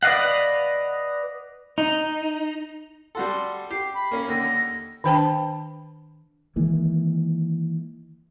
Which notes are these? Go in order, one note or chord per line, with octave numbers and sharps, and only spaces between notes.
B4 D5 D#5 F5 F#5
D#4
G3 F#4 A4 C6
G4 C7
B5
A#3 C#4
D#2 D3 A#6
D#3 D4 C5 G5 A5 B5
D#3 E3 G#3 A#3